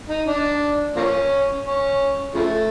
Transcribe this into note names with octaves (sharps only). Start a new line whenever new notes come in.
D#4
D4
F3 A#3 C#4
C#4
C#3 F3 A3